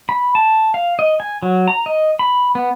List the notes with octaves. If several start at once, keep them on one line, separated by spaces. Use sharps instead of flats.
B5
A5
F5
D#5
G#5
F#3
A#5
D#5
B5
B3